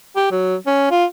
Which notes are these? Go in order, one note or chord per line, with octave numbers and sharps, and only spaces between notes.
G4
F#3
C#4
F4